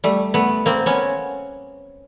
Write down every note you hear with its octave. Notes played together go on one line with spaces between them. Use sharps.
G3 A3
A3 B3
A#3 C4
B3 C#4